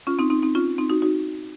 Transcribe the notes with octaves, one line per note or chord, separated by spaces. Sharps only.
C#4 F4
C4 D#4
C4 D#4
C4 D#4
C#4 F4
C4 D#4
D#4 F#4
D#4 F#4